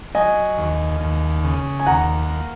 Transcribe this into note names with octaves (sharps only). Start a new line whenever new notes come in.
F#3 D#5 G#5
D#2
D#2
C#3
G#5
D#2 F#5 A#5
A#3